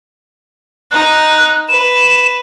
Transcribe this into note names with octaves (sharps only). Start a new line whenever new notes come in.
D#4 F#6
B4 E7